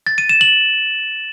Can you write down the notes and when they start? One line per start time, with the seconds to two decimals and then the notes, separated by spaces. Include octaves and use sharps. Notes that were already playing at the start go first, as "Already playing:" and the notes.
0.07 A6
0.18 D#7
0.29 E7
0.41 F#7